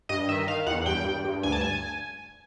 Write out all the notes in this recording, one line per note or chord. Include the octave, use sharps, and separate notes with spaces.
G2 D#5
D#3 E5
D#3 F5
E2 F#5
G2 G5
G2
G2
D2 G#5
A5
G#5